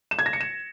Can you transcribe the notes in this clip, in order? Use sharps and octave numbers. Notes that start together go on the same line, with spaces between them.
E7
G#6
A#6
C#7
E7